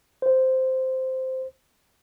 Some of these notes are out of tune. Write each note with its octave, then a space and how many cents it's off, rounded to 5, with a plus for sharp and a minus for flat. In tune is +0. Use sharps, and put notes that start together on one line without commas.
C5 -5